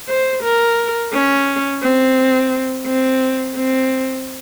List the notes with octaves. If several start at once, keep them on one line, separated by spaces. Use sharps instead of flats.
C5
A#4
C#4
C4
C4
C4